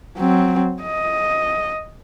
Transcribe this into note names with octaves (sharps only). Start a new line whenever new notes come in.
F#3 C4
D#5